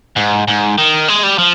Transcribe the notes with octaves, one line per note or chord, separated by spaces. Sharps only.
G#2
G#2
D#3
G#3
G3
F3